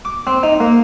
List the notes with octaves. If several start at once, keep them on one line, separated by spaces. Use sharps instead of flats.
D6
C4
D#4
A#3